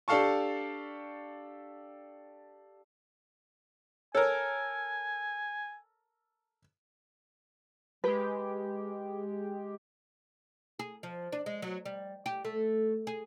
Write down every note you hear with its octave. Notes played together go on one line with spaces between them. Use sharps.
D4 G4 A4 F5 A5 C#6
A4 A#4 C#5 G#5
G#3 G4 B4
G#4
F3
D4
G#3
F#3
G3
G4
A3
G#4